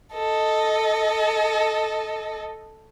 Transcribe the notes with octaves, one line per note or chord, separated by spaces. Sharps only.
A4 D#5